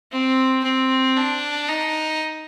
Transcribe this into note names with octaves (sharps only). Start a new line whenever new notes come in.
C4
C4
D4
D#4